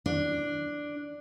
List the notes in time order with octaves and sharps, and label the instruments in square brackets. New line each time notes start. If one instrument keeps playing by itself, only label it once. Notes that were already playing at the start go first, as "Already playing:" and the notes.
[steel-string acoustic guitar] D4